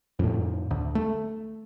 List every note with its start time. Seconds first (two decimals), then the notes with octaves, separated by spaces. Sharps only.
0.19 F2 A2
0.71 D2
0.95 A3